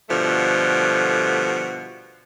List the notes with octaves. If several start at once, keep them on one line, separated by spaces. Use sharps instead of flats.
B2 D3 F3 G3 A3